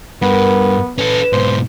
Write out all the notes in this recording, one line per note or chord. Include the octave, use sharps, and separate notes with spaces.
G2 B3 A#4
C#4 A4 B4
G#2 B2 C5